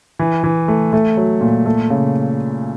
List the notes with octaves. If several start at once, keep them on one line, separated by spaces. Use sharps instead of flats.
E3
E3
A3
A3
F#3
A#2
A3
C#3